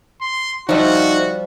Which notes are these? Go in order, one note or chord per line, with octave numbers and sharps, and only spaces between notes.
C6
F3 G3 D#4 F#4 C5 E5